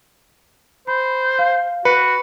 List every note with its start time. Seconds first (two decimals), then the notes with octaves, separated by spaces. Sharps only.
0.87 C5 B5
1.39 F5
1.85 F#4 B4 C#7